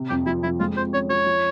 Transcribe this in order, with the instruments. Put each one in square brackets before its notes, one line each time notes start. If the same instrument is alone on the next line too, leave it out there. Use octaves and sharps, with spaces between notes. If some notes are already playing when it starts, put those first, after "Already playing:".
Already playing: [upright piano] C3
[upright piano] F2 [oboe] G4
[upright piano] F3 [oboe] E4
[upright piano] F2 [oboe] E4
[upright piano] G#3 [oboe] F4
[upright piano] F3 [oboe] C5
[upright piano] C#4 [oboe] C#5
[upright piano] F3 [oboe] C#5
[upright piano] F3